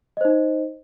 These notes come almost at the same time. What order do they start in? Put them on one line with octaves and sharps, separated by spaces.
D#5 C5 D#4